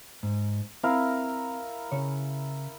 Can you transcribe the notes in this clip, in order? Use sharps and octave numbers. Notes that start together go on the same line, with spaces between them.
G#2
C4 E4 A#4 F5
C#3 C#5